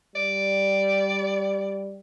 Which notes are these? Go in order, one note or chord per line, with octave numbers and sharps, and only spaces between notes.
G3 D5